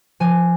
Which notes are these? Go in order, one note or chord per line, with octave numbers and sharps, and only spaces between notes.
F3 G#5